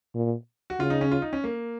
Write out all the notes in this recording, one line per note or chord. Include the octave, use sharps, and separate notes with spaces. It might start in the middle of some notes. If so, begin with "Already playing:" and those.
A#2
F#4
C#3 F4
D#4
C#4
F4
D#4
C#4
A#3